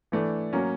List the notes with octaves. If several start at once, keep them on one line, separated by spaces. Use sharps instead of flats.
E3 A3 D4
F#3 A#3 C#4